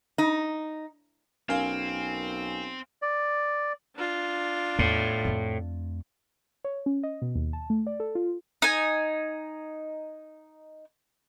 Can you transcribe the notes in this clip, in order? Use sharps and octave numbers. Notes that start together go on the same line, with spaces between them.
D#4
B1 C4 C#4 A#4 F5 G#5
D5
D4 F4
E2 A2
F2 A3
C#5
C#4
D#5
B2
D#2
A5
A3
D5
A4
F4
D#4 G#5